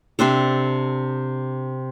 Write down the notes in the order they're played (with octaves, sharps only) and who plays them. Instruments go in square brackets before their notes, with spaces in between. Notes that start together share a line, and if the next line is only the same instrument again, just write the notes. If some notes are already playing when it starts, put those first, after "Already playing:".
[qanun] C3 C4 D4 A4